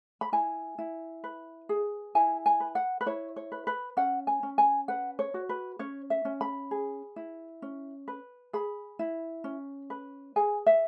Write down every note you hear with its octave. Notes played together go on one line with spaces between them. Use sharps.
B5
E4 G#5
E4
B4
G#4
E4 G#5
G#5
B4
F#5
B4
E4 C#5
C#5
B4
B4
C#4 F#5
G#5
C#4
G#5
B4 F#5
C#5
F#4
B4
C#4 C#5
E5
C#4
B5
G#4
E4
C#4
B4
G#4 B5
E4
C#4
B4
G#4 G#5
E5